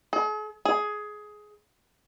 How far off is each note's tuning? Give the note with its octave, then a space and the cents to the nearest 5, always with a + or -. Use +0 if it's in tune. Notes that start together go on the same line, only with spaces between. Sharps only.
G#4 +45
G#4 +15